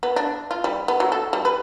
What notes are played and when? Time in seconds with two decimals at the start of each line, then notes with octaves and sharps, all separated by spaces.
0.03 B3
0.16 D4
0.51 F4
0.64 G3
0.88 B3
1.00 F#3
1.12 A4
1.33 G3
1.45 B4